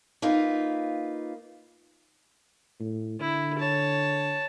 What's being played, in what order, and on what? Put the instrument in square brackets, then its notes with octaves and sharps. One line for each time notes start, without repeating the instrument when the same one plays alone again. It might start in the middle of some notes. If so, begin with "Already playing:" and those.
[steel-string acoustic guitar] A#3 D#4 F4 B4
[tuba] A2
[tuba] D3 [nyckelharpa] E4
[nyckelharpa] C#5 A5